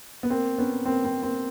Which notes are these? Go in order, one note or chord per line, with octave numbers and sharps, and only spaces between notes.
B3
A#3 C4
B3 C#4
A#3 C4
A#3 C4
A#3 C4